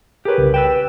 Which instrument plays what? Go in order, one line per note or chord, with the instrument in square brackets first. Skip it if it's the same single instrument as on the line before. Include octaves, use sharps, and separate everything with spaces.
[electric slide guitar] G4 B4 [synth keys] G#4 A#4 C#5
[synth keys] C2 C#3
[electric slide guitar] B4 G5 [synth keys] E6 E7